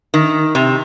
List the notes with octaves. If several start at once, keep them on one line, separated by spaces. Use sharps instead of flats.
D#3
C3